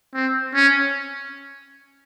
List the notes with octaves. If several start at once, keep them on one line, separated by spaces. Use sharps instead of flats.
C4
C#4